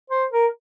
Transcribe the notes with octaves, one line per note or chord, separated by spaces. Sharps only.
C5
A#4